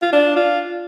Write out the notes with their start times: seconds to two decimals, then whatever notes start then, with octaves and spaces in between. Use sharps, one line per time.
0.02 F4
0.12 D4
0.36 F4